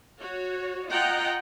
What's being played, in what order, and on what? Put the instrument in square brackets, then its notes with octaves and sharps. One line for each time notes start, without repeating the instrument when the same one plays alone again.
[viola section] F#4 C#5
F4 D#5 F#5 G5 A#5